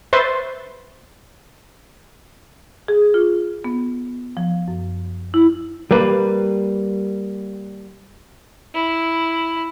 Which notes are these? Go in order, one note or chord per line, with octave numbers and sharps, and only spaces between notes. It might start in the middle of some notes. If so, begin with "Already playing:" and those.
B4 C5 E5 C6 C#6 A6
G#4
F4
B3
F3
F#2
E4
G3 A#3 B4
E4